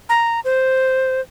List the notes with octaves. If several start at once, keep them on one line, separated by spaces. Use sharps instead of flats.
A#5
C5